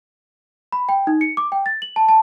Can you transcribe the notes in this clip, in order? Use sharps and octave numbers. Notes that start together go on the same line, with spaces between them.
B5
G5
D#4
C#7
D6
G5
A6
F#7
A5
A5